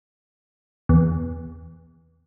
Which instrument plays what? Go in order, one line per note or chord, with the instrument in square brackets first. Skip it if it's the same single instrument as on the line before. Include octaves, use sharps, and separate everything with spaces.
[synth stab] E2